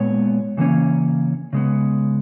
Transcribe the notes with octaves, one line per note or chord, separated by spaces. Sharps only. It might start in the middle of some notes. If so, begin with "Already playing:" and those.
Already playing: A#2 G#3 B3 C#5
C#3 E3 A#3 C#4
C#3 G#3 B3